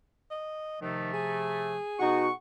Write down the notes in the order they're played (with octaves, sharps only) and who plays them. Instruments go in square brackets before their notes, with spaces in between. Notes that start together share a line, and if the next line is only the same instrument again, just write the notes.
[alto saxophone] D#5
[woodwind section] C3 F3 A3 [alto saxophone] D#3
[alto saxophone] G#4
[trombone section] B2 D#4 F#4 [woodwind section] F#5 C#6